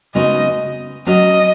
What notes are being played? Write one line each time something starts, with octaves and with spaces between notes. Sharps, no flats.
C#3 G#3 B3 D#4 F#4 D#5
F#3 C#4 F#4 D#5